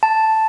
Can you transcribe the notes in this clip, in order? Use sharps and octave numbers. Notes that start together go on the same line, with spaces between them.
A5